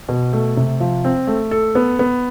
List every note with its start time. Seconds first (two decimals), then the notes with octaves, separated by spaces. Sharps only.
0.09 B2
0.33 A3
0.57 C3
0.80 F3
1.04 C4
1.27 A3
1.51 A4
1.75 B3
1.99 B3